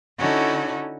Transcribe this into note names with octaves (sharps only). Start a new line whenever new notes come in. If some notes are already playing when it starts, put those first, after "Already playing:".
D3 C#4 D#4 E4 F#4 A4